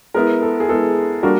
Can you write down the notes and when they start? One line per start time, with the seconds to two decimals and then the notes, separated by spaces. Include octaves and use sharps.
0.14 G#3 B3 E4 A#4
0.42 A4
0.60 G#4
0.69 G#3 B3 E4 A4
1.23 G3 A#3 D4 F#4 A#4